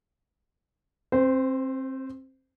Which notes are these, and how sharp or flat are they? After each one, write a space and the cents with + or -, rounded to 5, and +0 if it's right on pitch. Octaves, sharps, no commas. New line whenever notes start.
C4 +25 C5 -20